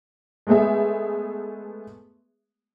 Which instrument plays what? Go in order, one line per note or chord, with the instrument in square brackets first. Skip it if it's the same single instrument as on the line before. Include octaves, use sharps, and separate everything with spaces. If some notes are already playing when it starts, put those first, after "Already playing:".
[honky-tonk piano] G#3 A3 B3 G#4 E5